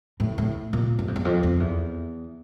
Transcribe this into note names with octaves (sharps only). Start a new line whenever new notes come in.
A2
A2
A#2
F#2
F2
E2
F2
F2
E2